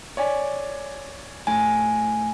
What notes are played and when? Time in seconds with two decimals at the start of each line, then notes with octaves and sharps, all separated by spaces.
0.17 C#5 D5 G#5
1.47 A2 G#5